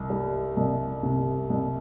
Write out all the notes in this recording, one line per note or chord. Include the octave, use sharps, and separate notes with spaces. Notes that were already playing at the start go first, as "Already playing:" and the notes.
Already playing: C2
G3
C2
C3
C2